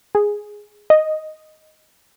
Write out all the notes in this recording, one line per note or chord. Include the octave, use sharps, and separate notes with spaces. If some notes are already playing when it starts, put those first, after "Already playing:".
G#4
D#5